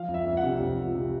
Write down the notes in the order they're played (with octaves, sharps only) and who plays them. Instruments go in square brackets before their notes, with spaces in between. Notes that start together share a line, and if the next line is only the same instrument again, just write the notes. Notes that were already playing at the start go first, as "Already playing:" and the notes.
Already playing: [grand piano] F3 F5
F2
E5
F2
F#5
C3
F2
F3
C3